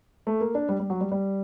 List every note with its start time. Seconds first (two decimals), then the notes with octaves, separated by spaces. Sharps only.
0.27 A3
0.40 A#3
0.55 D4
0.69 G3
0.80 G3
0.90 F#3
1.01 G3
1.12 G3